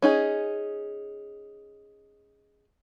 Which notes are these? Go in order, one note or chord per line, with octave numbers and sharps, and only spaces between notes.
C#4 D#4 G#4